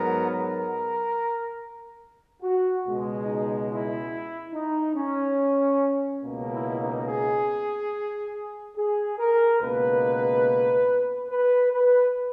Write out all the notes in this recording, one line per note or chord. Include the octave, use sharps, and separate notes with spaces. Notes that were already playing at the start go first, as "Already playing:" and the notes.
Already playing: G#2 F#3 B3 A#4
A#4
F#4
C#2 B2 G#3
D#4
E4
D#4
C#4
C#2 B2 A#3
E4
D#4
G#4
G#4
A#4
C#2 B2 A#3 B4
B4
B4